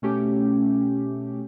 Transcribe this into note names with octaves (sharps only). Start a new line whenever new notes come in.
B2 A3 C#4 G4